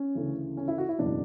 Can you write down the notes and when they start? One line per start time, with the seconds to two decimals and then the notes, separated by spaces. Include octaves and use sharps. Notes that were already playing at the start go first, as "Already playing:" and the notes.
Already playing: C#4
0.15 D2 C#3 E3
0.57 C#4
0.68 E4
0.78 F#4
0.89 E4
0.99 F#1 E2 B2 F#3 D4